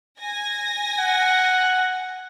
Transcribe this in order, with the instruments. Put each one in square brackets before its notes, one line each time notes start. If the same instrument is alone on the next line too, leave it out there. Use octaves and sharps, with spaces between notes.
[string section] G#5 A#6
[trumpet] F#5